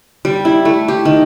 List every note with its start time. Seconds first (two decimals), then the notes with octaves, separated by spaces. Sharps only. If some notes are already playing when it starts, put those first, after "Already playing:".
0.25 G3
0.45 E4
0.65 A3
0.88 G4
1.05 D#3